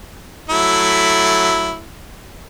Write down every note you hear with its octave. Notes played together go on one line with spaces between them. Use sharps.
F#3 A3 E4